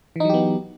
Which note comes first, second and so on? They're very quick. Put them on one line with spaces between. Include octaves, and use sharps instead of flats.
E3 D#4 F#3 G4 B3